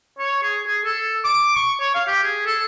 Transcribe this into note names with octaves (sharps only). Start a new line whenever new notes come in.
C#5
G#4
G#4
A4
D6
C#6
C#5
F5
G4
G#4
A4